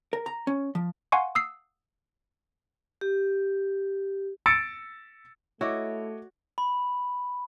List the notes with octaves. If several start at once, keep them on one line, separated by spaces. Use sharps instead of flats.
A#4
A#5
C#4
F3
F5 F#5 G#5 C6 C#6
D#6 E6 C7
G4
E6 A6 C#7 D7
A3 E4 F#4 C#5 D#5 D6
B5